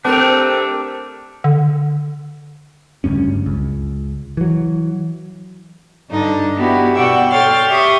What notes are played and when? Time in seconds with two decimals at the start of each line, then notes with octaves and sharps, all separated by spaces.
0.05 A3 C4 D4 G4 A#4
1.44 D3
3.04 F#1 D2 G2 C#4
3.46 C#2
4.37 E3 F#3
6.09 G2 D3 D4 D#4
6.57 B3 E4 F#4 G4
6.94 B2 D5 F#5 G5 C#6 E6
7.30 A4 C#5 G5 C6 F6 A6
7.68 G4 E5 C6 C#6 D#6